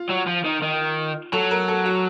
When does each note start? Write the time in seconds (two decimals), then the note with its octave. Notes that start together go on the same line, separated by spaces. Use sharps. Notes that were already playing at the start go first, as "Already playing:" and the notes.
Already playing: F4
0.10 F#3
0.28 F3
0.46 D#3
0.63 D#3
1.33 F#3 A4
1.51 A#4
1.68 A4
1.86 F#4